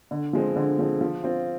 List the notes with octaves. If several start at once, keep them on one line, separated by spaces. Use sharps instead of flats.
D3
F3 G#3 C4
D3
F3 G#3 C4
F3
C4 F4